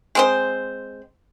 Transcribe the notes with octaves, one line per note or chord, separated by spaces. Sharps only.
G#3 C4 C5